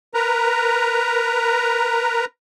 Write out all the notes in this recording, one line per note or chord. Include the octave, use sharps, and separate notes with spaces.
A#4 B4 A#5